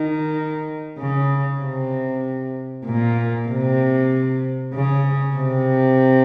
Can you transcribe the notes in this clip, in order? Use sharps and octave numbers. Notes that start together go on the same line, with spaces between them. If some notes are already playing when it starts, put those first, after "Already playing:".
Already playing: D#3
C#3
C3
A#2
C3
C#3
C3